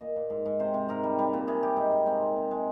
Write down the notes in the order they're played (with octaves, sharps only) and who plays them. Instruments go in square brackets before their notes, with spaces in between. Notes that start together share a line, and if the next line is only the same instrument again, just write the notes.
[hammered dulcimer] A#2 D#5
A#2
G#2
G#2
C3 C5
C3
G#2 A#4
G3
G3
A#2
C3 G#4
G3 G4
G#2 D#4
G#2
G#3 C4
A#2
C3
G#3